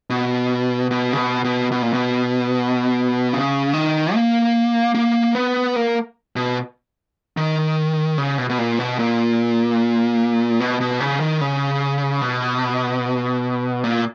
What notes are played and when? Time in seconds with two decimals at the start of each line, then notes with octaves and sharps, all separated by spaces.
0.10 B2
0.91 B2
1.13 C#3
1.17 B2
1.44 B2
1.72 B2
1.82 A#2
1.93 B2
3.33 C#3
3.73 D#3
4.14 A#3
4.95 A#3
5.35 B3
5.76 A#3
6.36 B2
7.37 D#3
8.18 C#3
8.38 B2
8.49 B2
8.58 A#2
8.79 B2
8.99 A#2
10.60 B2
10.81 B2
11.00 C#3
11.20 D#3
11.41 C#3
12.21 B2
13.84 A#2